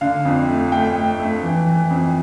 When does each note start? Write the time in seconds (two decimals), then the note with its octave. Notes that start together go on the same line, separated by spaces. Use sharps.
0.01 D3 F5
0.25 F2
0.49 A3
0.72 A3 G5
0.96 A3
1.20 A3
1.43 E3
1.66 E3
1.90 F2